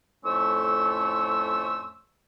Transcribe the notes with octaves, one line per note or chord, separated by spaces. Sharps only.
F2 A2 A3 C#4 C5 E6